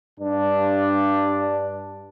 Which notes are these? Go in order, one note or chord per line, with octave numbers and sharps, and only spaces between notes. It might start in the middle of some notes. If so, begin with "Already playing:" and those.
G2 D4